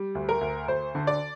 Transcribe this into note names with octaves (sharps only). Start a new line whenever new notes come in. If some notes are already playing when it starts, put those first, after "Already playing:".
Already playing: G3
D2
A#4
D2
D2 C5
D3
D5